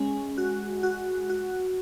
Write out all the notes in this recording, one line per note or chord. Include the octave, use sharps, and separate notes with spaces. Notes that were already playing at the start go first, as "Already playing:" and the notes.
Already playing: G#3 C#4
F#4
F#4
F#4